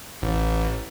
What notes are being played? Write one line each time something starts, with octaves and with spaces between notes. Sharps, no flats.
A1